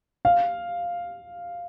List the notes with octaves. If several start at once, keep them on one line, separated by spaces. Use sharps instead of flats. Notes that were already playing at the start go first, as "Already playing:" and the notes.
F5